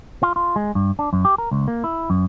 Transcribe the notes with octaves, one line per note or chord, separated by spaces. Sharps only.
F4
F4
G#3
G2
D4
F#2
G4
A#4
C#2
A#3
E4
F#2